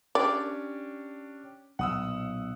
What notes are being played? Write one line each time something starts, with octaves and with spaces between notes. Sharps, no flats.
C#4 D4 G4 D5
B1 A#2 F#5 D#6 E6